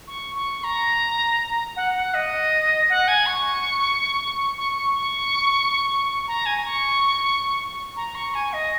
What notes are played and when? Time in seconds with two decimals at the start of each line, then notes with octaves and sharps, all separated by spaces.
0.07 C#6
0.35 C#6
0.64 A#5
1.76 F#5
1.95 F#5
2.14 D#5
2.89 F#5
3.08 G#5
3.26 C#6
4.58 C#6
4.77 C#6
4.95 C#6
6.28 A#5
6.46 G#5
6.65 C#6
7.96 A#5
8.15 C#6
8.34 G#5
8.53 D#5